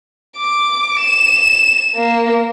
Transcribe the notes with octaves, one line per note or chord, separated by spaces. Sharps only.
D6
E7
A#3